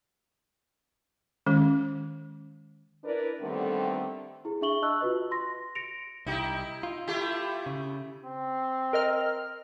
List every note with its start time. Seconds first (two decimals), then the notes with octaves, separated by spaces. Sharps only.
1.46 D#3 G#3 C#4
3.04 D4 E4 A#4 B4 D5
3.41 D3 D#3 G3 A3 B3 C4
4.45 E4 G#4
4.61 D4 G#4 E5 C#6 F#7 G7
4.82 D#5 A5 C#6 E6 F#6
5.01 F4 F#4 B4 D#5
5.31 C6 A#6
5.75 A#6 C#7 D7 F7
6.27 C2 D#4 E4 G4
6.83 F4
7.08 A3 E4 G4
7.66 C#3
8.25 C4
8.93 A#4 D#5 F6